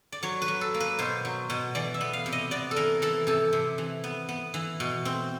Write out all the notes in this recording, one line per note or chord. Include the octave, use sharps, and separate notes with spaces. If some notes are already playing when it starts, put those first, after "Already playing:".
D5
F#3 C#5
B4
F#3
A4
A#3
B4
B2 C5
F#3
B2
E3 D5
E5
B3
F5
C3
D#5
B3 D5
A4
E3 A#4
E3 A4
C3 A4
C3
E3
B3
B3
E3
B2
C4